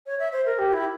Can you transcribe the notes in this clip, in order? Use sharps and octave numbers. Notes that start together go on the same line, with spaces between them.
C#5
E5
C5
A#4
G4
E4